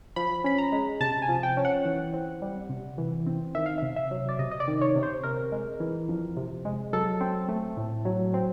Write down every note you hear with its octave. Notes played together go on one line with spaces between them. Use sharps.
F3 B5
C#4 B5
A#5
G#3
C3 A5
G#5
F3
G5
C#4
F#5
E3
C4
G3
C3
E3
C4
D#3 E5
F5
C3 E5
E5
F#3
D5
C3 D#5
D#5
D5
D#3
C#5
C3
C5
C3 A#4
G#3
E3
F2
C3
G#3
F#3 A4
C4
A3
A2
F#3
C4